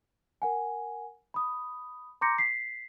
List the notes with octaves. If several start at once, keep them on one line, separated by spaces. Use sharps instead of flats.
A#4 F#5 G#5
B5 D#6
A#5 C6 D6 G6 A#6 C#7
B6 C7